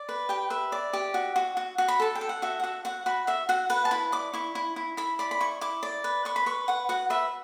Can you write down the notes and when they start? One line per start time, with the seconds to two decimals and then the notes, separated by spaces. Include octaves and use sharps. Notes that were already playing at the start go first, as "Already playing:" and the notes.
Already playing: D5
0.09 B4
0.29 G4 G5
0.50 B4 E5
0.72 D5
0.93 G4
1.14 F#4
1.36 F#4
1.57 F#4
1.78 F#4
1.88 B5
2.00 A4 A5
2.15 G5
2.21 A4
2.29 F#5
2.42 F#4 E5
2.60 F#5
2.63 F#4 E5
2.85 F#4 F#5
3.06 F#4 B5
3.27 F#4 E5
3.49 F#4 F#5
3.70 B4 F#5
3.85 A5
3.91 E4 B5
4.12 D5 D6
4.34 E4 C#6
4.55 E4
4.76 E4
4.97 E4 B5
5.19 D5 B5
5.31 B5
5.40 E4 C#6
5.61 E4 D6
5.83 D5
6.04 B4
6.25 B4 C#6
6.36 B5
6.46 B4 C#6
6.68 B4 F#5
6.89 F#4 F#5
7.10 B4 E5